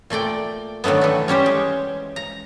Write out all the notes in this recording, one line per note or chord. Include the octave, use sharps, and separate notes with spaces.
A#2 A3 D5 G5
D3 D#3 F#3 A3 B3
E3 A3
G3 C#4 G4 C5
G#3
A#5